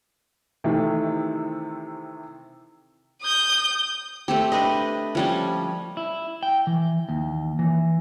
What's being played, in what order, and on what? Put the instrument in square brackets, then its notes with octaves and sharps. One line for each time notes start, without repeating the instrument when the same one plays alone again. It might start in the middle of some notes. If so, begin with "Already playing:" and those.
[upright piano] C3 D#3 E3 A3
[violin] D#6 G6
[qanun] A3 C4 G4
D4 B4 D#5
F3 G3 C#4
[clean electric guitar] E4
G5
E3
D#2
E3